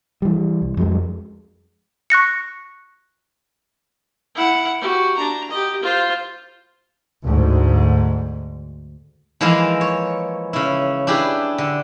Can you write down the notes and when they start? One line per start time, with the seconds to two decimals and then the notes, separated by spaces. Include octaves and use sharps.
0.22 E3 G3
0.62 C2
0.77 F2 F#3 G#3
2.10 C#6 F#6 A#6 C#7
4.35 E4 F#5
4.81 F#4 G4
5.16 D4 A#5
5.51 G4 D#5
5.82 F4 C5
7.23 D2 G#2
9.41 E3 F3 G#3 A#3 E4 A#4
9.81 C#5
10.53 C#3 E4
11.07 D4 E4 G4 G#4 B4
11.58 D3